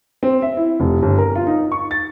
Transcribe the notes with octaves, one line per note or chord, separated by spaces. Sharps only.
C4
E5
E4
F1
G1
A#4
F4
D#4
C#6
A6